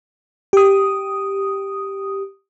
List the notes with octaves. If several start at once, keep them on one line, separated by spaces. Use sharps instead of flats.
G4 D#6